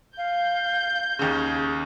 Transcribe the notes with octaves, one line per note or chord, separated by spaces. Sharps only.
F5 G6
D#2 C#3 G#4